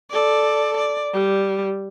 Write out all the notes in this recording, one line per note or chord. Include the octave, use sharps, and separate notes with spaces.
A4 D5
D5
G3